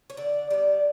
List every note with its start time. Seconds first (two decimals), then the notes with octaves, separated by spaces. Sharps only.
0.10 C#5
0.17 D3 D5
0.50 G3 B3 D5